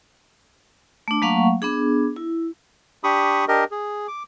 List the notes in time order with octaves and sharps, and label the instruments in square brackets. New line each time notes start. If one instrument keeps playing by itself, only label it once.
[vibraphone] A3 D4
F#3 A3 A#3 F5 F#5 C#6
B3 D4 G#4
E4
[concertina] D4 G4 B5 C#6 D#6
D4 G4 A#4 D#5
G#4
D6